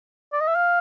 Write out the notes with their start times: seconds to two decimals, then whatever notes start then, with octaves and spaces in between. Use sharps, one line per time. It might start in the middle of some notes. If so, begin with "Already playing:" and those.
0.33 D5
0.40 D#5
0.48 E5
0.55 F5